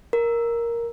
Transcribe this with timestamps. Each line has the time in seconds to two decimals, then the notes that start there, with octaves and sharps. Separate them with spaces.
0.13 A#4